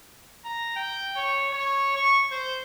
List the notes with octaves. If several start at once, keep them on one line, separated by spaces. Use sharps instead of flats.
A#5
G5
C#5
C#5
C#6
C5